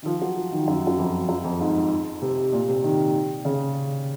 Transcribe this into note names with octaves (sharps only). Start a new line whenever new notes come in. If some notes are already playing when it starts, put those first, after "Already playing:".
D#3
F3
F#3
F3
D#3
F#2
F#2
F2
F#2
F2
G#2
C3
A#2
C3
D#3
C#3